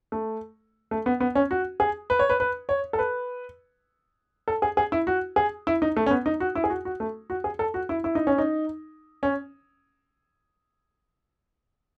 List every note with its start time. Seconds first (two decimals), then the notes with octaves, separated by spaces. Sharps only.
0.12 A3
0.91 A3
1.06 B3
1.20 B3
1.35 C#4
1.51 F#4
1.80 G#4
2.10 B4
2.19 C#5
2.30 B4
2.40 B4
2.69 C#5
2.93 A4
2.99 B4
4.48 A4
4.62 G#4
4.77 G#4
4.92 E4
5.07 F#4
5.36 G#4
5.67 E4
5.82 D#4
5.97 A3
6.06 C#4
6.11 B3
6.26 D#4
6.40 F#4
6.55 E4
6.64 G#4
6.70 F#4
6.85 F#4
7.00 A3
7.30 F#4
7.44 G#4
7.59 A4
7.74 F#4
7.89 E4
8.04 E4
8.15 D#4
8.27 C#4
8.38 D#4
9.23 C#4